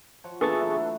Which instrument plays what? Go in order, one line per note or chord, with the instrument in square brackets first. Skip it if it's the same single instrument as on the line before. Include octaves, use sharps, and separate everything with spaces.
[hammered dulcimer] F3 F#4 C#5
[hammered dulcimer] A#2 E3 [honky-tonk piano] B3 D4 A4 [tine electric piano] G#4 C#6 A6
[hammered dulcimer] E3 F#3 A3